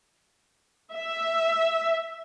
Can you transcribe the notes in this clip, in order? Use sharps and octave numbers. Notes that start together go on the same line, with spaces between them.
E5